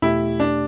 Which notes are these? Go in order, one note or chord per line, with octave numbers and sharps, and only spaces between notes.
E2 B2 A3 E4 G4
D4